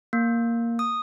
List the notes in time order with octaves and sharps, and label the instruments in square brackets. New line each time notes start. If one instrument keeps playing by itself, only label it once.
[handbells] A#3
D#6